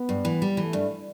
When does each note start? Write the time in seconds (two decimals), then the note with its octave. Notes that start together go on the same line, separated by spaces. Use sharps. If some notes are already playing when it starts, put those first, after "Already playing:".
Already playing: B3
0.09 G2
0.25 E3
0.42 G3
0.57 E3 A3
0.73 G2